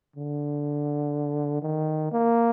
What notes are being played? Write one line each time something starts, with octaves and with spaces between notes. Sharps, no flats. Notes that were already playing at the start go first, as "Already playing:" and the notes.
D3
D#3
A#3